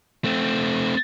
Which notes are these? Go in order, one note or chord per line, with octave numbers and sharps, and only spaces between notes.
A3 C4